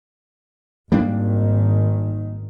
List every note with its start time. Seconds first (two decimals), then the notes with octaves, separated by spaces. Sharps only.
0.92 G#1 D#3 G3 A#3 D4